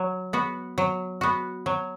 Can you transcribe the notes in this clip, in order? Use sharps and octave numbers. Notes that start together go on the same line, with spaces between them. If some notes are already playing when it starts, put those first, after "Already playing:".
Already playing: F#3
B3 F#4
F#3
B3 F#4
F#3